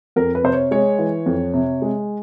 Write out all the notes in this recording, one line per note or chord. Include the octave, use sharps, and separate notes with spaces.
F2 A#4
B4
C3 C5
C#5
G#3 C#5
E3
F2
C3
G#3